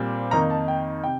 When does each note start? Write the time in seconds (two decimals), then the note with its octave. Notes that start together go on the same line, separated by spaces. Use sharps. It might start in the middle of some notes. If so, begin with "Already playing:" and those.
Already playing: A#2 G3 C4
0.31 F2 D#3 A#3 D#4 A#5
0.50 A5
0.68 G5
1.04 C3 G5